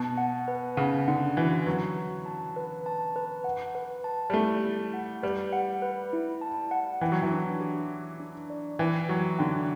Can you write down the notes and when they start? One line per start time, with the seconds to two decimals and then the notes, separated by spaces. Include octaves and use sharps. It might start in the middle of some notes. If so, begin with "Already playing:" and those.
Already playing: B2 A5
0.18 F#5
0.48 B4
0.77 C#3 F#5
1.08 D3 F#5
1.37 E3 F#4
1.67 F#3 B4
1.97 F#4
2.26 A5
2.56 B4
2.86 A5
3.16 B4
3.44 F#5
3.75 B4
4.04 A5
4.30 G3
4.33 A3 E4
4.64 E4
4.94 F#5
5.23 G3 B4
5.53 F#5
5.82 B4
6.13 E4
6.41 A5
6.71 F#5
7.01 E3 G5
7.12 F#3
7.22 E3
7.32 D4
7.60 G4
7.91 G4
8.20 D4
8.50 D5
8.79 E3 G5
9.09 F#3 G4
9.39 D3 G5